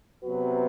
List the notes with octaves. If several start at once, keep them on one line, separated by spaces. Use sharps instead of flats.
C3 F#3 B3 F#4 B4